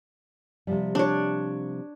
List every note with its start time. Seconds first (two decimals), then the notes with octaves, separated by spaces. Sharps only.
0.67 C3 F3 G3
0.95 D4 C#5